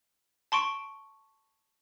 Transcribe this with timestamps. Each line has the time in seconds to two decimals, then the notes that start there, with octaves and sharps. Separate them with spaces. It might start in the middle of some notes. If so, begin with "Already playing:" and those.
0.52 A5 C6 C#6 D7